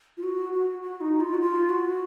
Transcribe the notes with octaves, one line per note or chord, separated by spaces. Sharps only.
F4
F#4
F#4
F#4
D#4
F4
F#4
F4
F#4